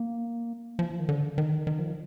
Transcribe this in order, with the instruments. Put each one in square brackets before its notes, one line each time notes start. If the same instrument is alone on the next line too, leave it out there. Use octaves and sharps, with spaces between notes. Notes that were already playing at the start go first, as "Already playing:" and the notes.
Already playing: [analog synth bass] A#3
F3
D#3
D3
D#3
D#3
F3